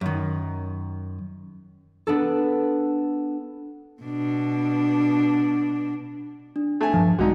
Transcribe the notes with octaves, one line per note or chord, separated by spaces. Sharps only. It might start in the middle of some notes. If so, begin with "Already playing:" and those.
F#2 D#3
B3 D4 A4
B2 D4
D4
A3 G#5
G2 F3
A#1 D3 G#3 D4 D#4 F#4